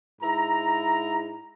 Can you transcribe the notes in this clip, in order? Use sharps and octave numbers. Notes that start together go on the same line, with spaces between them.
G#2 E4 A#5